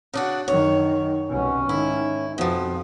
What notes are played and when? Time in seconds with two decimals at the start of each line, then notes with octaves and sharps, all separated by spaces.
0.14 C#3 D4 F#4
0.48 F#2 D#3 C#5
1.29 C2 B2 C#4
1.69 G#2 D#3 E4
2.38 F2 B2 F3